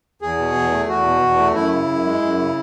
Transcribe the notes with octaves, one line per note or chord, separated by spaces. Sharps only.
E2 G#4
B2
E2
A3
E2 F#4
B2
E2
A3
F#2 E4
C#3
F#2
G#3
F#2
C#3